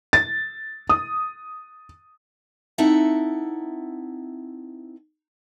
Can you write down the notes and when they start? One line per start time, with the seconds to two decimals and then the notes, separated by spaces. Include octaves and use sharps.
0.13 A6
0.89 D#6
2.78 C4 D#4 E4 A4 E5 F#5